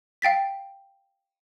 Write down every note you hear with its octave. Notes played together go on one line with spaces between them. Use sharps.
F5 G5 A6 B6